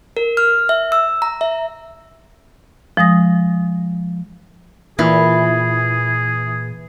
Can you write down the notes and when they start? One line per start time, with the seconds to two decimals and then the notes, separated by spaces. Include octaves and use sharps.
0.17 A#4
0.37 F6
0.69 E5
0.92 E6
1.22 A#5
1.41 E5
2.97 F3 G#3 D#6 A#6
4.99 A#2 E3 G#4